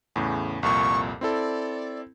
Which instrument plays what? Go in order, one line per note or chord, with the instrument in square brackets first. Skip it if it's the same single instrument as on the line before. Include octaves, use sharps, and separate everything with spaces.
[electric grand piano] E2 A2 C#3
[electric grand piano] C2 F2 A#2 [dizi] C#6
[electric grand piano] C4 E4 A4 [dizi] D5